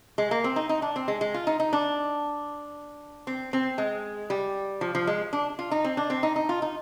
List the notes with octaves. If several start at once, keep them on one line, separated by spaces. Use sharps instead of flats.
G#3
A#3
C4
D#4
D#4
D4
C4
G#3
G#3
F4
D#4
D#4
D4
C4
C4
G#3
G3
F3
F3
G#3
D4
F4
D#4
C4
D4
C4
D#4
D#4
F4
D#4